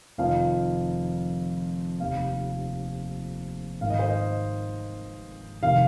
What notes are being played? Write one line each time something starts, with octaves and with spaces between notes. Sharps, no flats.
F1 F2 D#3 F5
F1 D#2 D#3 F5
G#1 G#2 D#3 F5
D#5
C5
D#5
F1 C3 D#3 F5